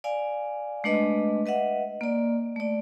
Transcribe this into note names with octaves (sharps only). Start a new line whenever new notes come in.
D5 F5 G#5
G#3 A3 D4 B4 D#5
B4 D#5 E5 F#5
A#3 D5
A3 D5